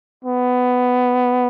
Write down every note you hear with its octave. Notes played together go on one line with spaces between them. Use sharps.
B3